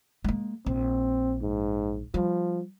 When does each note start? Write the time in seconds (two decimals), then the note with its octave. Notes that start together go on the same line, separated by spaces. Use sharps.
0.24 G#3 A#3
0.66 A#1 C4
1.42 G#2
2.14 F3 G3